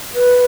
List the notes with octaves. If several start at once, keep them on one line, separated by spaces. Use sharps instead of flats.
B4